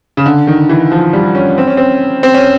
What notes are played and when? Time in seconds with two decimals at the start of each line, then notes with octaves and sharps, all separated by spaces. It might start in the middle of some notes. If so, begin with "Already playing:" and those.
0.17 C#3
0.26 D3
0.47 D#3
0.69 E3
0.92 F3
1.13 G3
1.35 C#4
1.58 C4
1.67 C#4
1.77 C4
2.23 C4
2.34 C#4